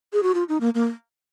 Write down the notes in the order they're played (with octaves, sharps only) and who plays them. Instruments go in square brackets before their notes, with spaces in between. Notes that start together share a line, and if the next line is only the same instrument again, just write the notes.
[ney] G#4
F#4
F4
D#4
A#3
A#3